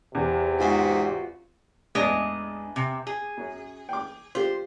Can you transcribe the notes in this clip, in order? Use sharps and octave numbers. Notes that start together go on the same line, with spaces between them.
E2 C3
G#2 F4 F#4
A1 E2 G#3 D4 D#5
C3
G#4
F#2 C#4
G5 D6
F4 G4 C5